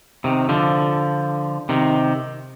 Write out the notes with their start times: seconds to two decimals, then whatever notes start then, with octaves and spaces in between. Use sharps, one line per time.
0.24 C3 D#3
0.49 D3 F3
1.69 C3 D#3